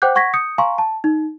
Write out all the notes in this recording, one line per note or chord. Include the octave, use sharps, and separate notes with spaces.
C5 F#5 G5 D6 F#6 G6
F#5 C#6 G#6 A#6 B6
D#6 G6 C#7
F5 G#5 A#5 C6 C#6
A5
D#4